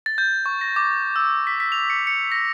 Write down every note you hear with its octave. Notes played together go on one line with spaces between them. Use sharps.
A6
G6
C#6
A#6
D6
E6
B6
B6
F7
C#7
C#7
A#6